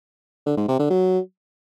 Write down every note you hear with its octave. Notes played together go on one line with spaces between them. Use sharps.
D3
G#2
C3
D3
F#3